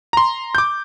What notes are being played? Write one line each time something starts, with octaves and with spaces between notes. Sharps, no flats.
A#5 C6
D6 G6